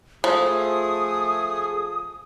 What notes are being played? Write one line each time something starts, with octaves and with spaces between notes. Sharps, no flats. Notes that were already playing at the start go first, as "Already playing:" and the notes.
F3 A3 G#4 D#6